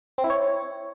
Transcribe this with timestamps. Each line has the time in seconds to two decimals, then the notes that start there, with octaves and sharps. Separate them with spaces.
0.18 C4
0.24 E4
0.30 C#5